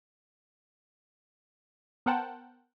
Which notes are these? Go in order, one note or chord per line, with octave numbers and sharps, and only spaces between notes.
B3 A#4 C5 F#5 G5 A5